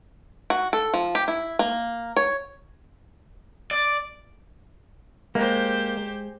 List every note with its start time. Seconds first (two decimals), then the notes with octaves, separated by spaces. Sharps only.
0.50 F#4
0.73 A4
0.94 F3
1.15 G4
1.28 E4
1.59 A#3
2.17 C#5
3.71 D5
5.35 G#3 A#3 G4 C5